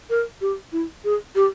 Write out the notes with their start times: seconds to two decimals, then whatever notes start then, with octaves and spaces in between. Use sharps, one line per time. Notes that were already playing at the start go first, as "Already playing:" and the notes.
0.10 A#4
0.41 G4
0.73 E4
1.04 G#4
1.35 G4